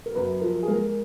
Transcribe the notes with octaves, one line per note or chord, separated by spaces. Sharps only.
A#4
F#2 B4
F3 A#4
G#4
G#3 A#4